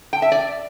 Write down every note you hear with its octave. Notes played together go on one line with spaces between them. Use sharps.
G5
E5
D5